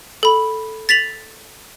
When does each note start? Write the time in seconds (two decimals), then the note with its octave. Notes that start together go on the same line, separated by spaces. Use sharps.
0.23 A4 B5
0.89 A6 B6 F7 F#7